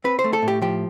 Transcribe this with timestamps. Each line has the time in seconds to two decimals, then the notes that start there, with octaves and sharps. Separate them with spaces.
0.04 C4 B4
0.19 C5
0.24 A3
0.33 A4
0.42 A2
0.48 G4
0.62 F3 G4